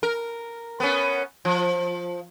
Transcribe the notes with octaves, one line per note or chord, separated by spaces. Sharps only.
A#4
B3 C#4
F3